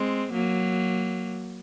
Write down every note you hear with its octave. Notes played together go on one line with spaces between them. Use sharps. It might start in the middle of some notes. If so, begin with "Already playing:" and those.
Already playing: G#3 C4
F#3 A#3